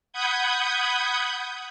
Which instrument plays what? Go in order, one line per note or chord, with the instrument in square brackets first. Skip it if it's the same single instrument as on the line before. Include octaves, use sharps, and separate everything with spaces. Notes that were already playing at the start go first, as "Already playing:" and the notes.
[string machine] F#5 B5 D#6 G6 G#6